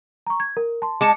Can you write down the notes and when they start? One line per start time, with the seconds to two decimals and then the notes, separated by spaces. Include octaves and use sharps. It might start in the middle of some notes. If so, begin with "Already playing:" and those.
0.27 A#5 C#6
0.40 G#6
0.57 A#4
0.82 A5 C6
1.01 G#3 A5 D6 C#7